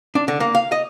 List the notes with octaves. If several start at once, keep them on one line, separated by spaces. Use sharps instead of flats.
D4
D3
A#3
F5
D#5